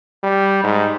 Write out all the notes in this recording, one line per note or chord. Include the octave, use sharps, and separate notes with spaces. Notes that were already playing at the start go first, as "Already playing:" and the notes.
G3
G#2